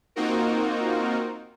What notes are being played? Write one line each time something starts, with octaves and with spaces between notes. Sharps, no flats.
A#3 C4 D#4 F4 F#4 A#4